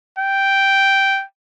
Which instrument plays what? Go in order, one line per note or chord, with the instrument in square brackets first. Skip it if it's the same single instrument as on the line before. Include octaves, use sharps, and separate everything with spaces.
[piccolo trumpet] G5